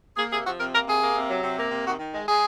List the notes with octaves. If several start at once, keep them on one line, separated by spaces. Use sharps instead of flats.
A#3 G#4
C3 G#4
F3 F#4
C3 A#4
A#3 A#4
C3 G#4
A#3
C3
F#3
C3
A#3
C3
D#3 F#4
D#3
G#3
G#3 G#4